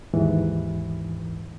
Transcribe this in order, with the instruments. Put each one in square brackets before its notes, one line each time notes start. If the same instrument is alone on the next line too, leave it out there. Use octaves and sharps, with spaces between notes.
[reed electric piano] D#2 G#2 E3